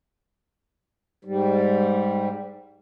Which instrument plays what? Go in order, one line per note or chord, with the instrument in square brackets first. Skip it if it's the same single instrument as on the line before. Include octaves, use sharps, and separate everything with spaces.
[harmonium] G#2 G3